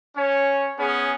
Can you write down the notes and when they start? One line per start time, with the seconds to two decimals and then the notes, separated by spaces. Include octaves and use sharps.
0.16 C#4 C#5
0.78 B3 C#4 G#4